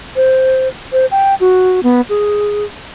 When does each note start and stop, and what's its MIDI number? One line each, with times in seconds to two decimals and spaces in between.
0.16 0.68 72
0.92 1.06 72
1.11 1.35 79
1.40 1.83 66
1.83 2.01 59
2.09 2.65 68